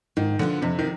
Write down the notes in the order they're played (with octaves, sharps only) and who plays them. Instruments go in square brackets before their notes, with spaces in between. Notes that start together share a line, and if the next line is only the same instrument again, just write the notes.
[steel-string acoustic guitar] G#2 [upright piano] D#3
[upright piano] D3 [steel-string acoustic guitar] F3 B3 F4
[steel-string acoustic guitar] F2 [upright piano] C3
[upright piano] D#3